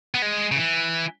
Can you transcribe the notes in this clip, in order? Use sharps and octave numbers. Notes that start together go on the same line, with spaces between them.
B3
G#3
C#3
E3